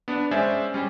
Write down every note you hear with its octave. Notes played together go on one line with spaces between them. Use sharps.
B3 D4
G#3 C#4 C5 D5 E5 G#5
G3 C#4